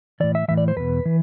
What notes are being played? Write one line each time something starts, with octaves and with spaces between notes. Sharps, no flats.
A2 E3 D5
E5
A2 E3 E5
D5
C5
E2 B2 B4
E3